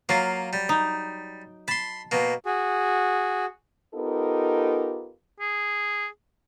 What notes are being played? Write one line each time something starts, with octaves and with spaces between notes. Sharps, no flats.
F#3 A#3 F4
G3
D#4
A5 B5 C6
B2 A#3
F#4 G#4
B3 D#4 F4 G4 A4 A#4
G#4